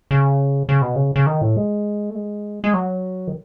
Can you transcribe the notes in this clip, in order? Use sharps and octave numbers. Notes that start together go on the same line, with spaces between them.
C#3
C#3
B2
C#3
C#3
D#3
A2
G#3
A3
G#3
G#3
F#3
D#3